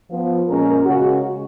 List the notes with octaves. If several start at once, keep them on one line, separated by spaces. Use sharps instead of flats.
F3 B3
A#2 G#3 C#4 A#4
C#3 G#3 C#4 F#4